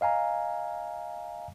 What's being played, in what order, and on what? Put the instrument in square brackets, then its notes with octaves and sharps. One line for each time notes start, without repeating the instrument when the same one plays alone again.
[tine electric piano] D#5 F5 G#5 A#5